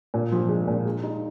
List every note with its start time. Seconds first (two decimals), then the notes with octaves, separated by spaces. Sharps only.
0.14 A#2
0.32 F3
0.49 G#3
0.68 A#2
0.85 G#3
1.03 D#4